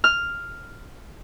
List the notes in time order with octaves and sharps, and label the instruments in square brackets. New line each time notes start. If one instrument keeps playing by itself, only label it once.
[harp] F6